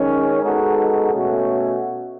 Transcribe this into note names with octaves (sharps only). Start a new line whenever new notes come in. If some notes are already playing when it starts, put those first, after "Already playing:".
Already playing: D#3 G#3 C#4
G#3 B3 D#4 F#4 A4
B2 A3 C#4 F#4